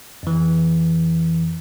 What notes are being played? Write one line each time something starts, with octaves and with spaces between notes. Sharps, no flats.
F2 E3